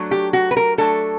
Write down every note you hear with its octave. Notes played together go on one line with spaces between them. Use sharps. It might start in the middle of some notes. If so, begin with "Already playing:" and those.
Already playing: F#3 A3 D4
G4
F#4
B4
A#4
F#3 A3 D4 A4